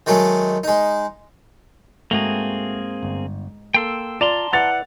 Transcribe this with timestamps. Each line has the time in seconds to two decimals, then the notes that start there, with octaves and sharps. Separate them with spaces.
0.06 D#3 F#3 G#3 A3
0.64 G#3 D#4
2.11 G#2 A3 A#3 C4 F#4 G#4 A#5 F7
3.03 G1
3.74 A#3 A4 G5 C6 E6
4.21 F4 D5 A5 A#5 C6
4.53 E4 B4 D5 F#5 A6 F7